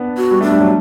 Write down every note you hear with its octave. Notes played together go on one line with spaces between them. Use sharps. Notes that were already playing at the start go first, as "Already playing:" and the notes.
Already playing: B3 D4
F#4
G3
A3 D4
G3
F#3